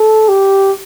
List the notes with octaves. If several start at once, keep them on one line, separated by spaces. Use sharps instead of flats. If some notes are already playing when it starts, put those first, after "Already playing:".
Already playing: A4
G4